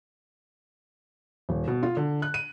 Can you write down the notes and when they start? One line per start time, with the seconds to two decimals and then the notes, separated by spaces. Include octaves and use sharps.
1.49 D#1
1.67 B2
1.83 F4
1.97 D3
2.22 F#6
2.34 D#7